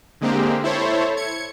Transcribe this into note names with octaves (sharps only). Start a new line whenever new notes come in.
D3 G#3 A#3 C4 G4
E4 A4 C5 C#5
G#6 C#7